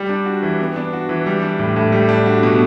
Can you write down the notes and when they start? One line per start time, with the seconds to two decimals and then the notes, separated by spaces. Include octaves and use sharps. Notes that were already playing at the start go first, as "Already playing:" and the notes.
Already playing: G3
0.09 D4
0.26 F#4
0.43 E3
0.60 B3
0.76 D4
0.93 F#4
1.09 E3
1.26 G3
1.43 D4
1.59 A2
1.76 A2
1.92 G3
2.09 D4
2.26 F#4
2.43 B2